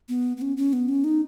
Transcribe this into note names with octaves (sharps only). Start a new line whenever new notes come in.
B3
B3
C#4
C#4
B3
C#4
D#4